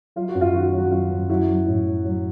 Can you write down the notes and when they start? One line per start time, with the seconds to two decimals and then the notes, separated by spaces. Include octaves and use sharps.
0.16 F#3 F4
0.29 F#4
0.35 F#2
0.41 F4
0.54 D#3 F#4
0.66 F4
0.73 F#3
0.78 F#4
0.91 F#2 F4
1.11 F#2
1.29 F#3 E4 F#4
1.48 F#3
1.67 A2
1.86 F#3
2.04 F#3